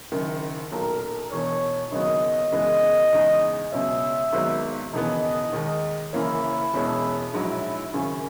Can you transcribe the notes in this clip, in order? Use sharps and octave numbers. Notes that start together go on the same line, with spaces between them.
F#1 F#2 D#3
B1 A#2 F#3 A#4
E1 E2 B2 C#5
G#1 F#2 C#3 F#3 B3 D#5
F#1 F#2 E3 G#3 B3
E2 C#3 E3 G#3 D#4
C#2 B2 F#3 C#4 E5
G#1 G#2 F#3 B3
E1 D#2 C#3 E3 B3 D#5
D#2 D#3 G#3
F#1 F#2 E3 A#3 C#4 E4
E1 E2 B2 G#3 C#4
A#1 G#2 F#3 C#4 E4 F#4
G#1 F#2 C#3 C#4